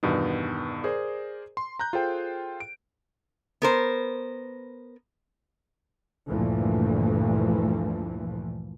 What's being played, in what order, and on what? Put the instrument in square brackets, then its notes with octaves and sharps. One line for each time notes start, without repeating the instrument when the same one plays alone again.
[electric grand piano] E2 G2 B2 D#3 B3
G#4 A#4 C5 D5
C6
A#5 F#6 G6
F4 G#4 A4 C5 G5
D7
[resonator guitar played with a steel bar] B3 A#4 C5
[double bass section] D2 G2 A#2 E3 F3 A3